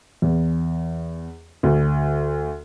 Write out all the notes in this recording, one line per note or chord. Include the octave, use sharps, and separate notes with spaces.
E2
D2